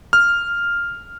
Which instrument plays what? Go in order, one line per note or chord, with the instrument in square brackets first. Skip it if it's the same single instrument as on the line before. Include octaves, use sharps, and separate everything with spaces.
[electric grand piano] F6